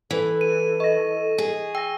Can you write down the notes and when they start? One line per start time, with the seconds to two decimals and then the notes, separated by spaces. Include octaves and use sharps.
0.10 E3 A4
0.41 D#7
0.80 D#5 C#6 A#6
1.38 G#4
1.75 G5 E6 A#6